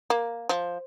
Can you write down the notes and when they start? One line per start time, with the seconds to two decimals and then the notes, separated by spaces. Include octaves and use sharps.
0.10 A#3
0.49 F3